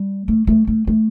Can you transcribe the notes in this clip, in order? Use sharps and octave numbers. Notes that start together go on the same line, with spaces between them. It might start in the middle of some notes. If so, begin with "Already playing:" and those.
Already playing: G3
A3
A3
A3
A3